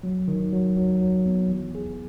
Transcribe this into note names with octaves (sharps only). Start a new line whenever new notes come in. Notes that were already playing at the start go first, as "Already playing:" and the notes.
F#3
D#3
F#3
F#3
F#3
B3
E3
G#4